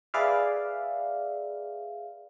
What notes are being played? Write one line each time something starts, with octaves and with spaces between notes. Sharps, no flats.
G#4 B4 D5 E5 F5